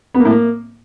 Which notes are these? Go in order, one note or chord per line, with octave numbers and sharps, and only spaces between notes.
B3
A#3
A2
A#3